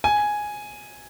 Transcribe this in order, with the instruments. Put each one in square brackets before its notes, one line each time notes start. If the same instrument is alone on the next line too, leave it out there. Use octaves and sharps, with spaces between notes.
[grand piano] G#5